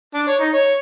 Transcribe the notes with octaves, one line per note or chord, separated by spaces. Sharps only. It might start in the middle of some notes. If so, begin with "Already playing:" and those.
D4
C#5
D#4
C#5